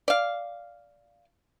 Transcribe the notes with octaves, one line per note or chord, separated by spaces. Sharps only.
D5 F5